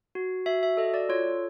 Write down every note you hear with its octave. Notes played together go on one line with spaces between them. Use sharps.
F#4
F#4 E5
E5
A4 D#5
D5
F4 C#5